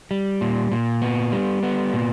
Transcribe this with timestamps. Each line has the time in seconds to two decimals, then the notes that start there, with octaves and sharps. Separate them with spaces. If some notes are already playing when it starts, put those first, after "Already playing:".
0.11 G3
0.41 A#2
0.72 A#2
1.02 B3
1.32 G3
1.63 B3
1.93 A#2